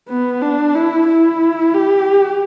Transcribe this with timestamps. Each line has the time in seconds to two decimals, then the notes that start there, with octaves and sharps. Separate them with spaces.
0.09 B3
0.42 D4
0.75 E4
1.07 E4
1.74 G4